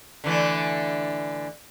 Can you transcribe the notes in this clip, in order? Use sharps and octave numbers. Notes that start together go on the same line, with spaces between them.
D3 E3 A3